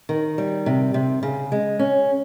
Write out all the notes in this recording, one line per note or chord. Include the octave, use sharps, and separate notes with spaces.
D#3
G3
C3
C3
C#3
G#3
C#4